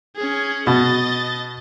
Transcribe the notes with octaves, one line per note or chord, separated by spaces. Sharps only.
C#4 G#4
B2 D#5 A6